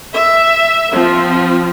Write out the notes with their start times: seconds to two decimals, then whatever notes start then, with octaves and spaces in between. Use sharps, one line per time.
0.14 E5
0.93 F3 C4